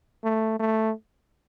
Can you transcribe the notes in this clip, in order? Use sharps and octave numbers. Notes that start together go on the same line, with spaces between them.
A3
A3